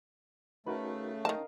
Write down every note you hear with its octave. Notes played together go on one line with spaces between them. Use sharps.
C#3 A3 D#4 F#4 A#4 B4
D#3 C#4 D#4 A#4 D#5 F5 A5